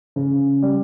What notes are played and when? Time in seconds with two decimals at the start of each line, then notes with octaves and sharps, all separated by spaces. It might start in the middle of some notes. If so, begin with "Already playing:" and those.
0.16 C#3
0.62 G3